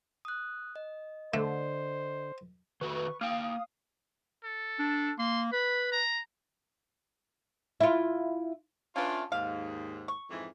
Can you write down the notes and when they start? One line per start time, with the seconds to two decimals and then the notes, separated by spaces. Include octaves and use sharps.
0.25 D#6 F#6
0.76 D#5
1.34 D3 A3 C5
2.81 D#3 F#4 A4 B4 C#6
3.21 A#3 F5 G5 D#6
4.44 A4
4.79 D4
5.18 A#3 C6
5.52 B4 B5
5.92 A#5
7.80 E4 F4
8.96 A3 C#4 D4 F4 B4
9.32 D#2 G#2 F5
10.08 C#6
10.30 F2 G#2 E3